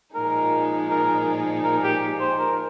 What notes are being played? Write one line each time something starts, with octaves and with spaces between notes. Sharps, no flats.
A#2 F3 G#3 D#4 A#4
A#4
A#4
G4
C5
A#4